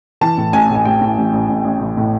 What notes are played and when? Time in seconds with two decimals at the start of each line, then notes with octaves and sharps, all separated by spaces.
0.21 E3 A5
0.38 A2
0.53 A1 G#5
0.70 A2
0.75 G#5
0.85 A1 G5
1.01 A2
1.17 A1
1.33 A1
1.49 A1
1.65 A1
1.81 A1
1.97 A2